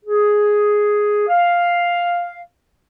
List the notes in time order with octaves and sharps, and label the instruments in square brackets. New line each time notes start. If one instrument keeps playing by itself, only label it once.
[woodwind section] G#4
F5